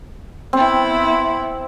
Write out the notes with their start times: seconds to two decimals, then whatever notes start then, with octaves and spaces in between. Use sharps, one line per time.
0.53 B3 C4 E4